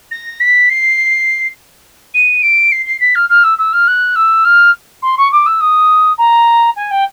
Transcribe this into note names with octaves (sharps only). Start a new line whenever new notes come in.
A#6
B6
C7
D#7
D7
C7
C7
B6
F6
F6
E6
E6
F6
F#6
E6
F6
C6
C#6
D6
E6
D#6
A#5
G#5
G5